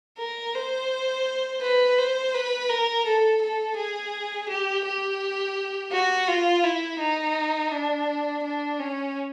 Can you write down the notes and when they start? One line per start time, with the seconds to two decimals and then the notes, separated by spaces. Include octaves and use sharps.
0.18 A#4
0.54 C5
1.61 B4
1.98 C5
2.34 B4
2.69 A#4
3.06 A4
3.42 A4
3.77 G#4
4.49 G4
4.85 G4
5.92 F#4
6.28 F4
6.63 E4
7.00 D#4
7.71 D4
8.43 D4
8.80 C#4